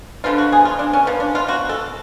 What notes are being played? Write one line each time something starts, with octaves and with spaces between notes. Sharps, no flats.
D3 F3 B3 F4
F#4
G#4
F4
D4
C#4
F3 B3
D4
F4
F#4
A4